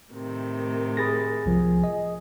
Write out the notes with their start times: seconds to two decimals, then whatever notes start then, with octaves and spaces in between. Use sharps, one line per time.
0.12 A2 C3 D#3
0.97 G#4 B5 A6 A#6
1.46 C2 F3
1.84 D#5